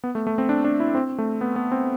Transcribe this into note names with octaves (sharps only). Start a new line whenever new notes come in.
B3
A3
A3
C4
D4
D4
E4
C4
A3
B3
B3
C4